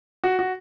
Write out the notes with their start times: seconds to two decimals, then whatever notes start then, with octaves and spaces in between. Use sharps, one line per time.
0.24 F#4
0.39 F#4